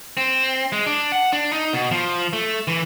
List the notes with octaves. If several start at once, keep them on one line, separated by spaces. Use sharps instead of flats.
C4
G#3
D4
F#5
D4
D#4
B2
F3
A3
E3